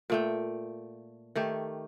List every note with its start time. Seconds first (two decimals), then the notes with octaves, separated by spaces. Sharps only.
0.10 A#2 A3 G5
1.35 D#3 A3 G4